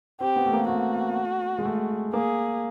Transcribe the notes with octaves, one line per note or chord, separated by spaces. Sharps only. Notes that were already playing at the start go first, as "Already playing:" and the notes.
C4 G4
B3
A3
A#3
A3 F#4
G#3
A3
A#3 G#4